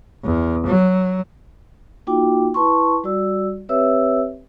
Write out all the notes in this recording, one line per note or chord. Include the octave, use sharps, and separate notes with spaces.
E2
F#3
A#3 D#4 F4 F#4 G5 D6
E4 B4 A5 C6 C#6
G3 F#4 D5 E6
C4 G4 B4 C#5 E5 E6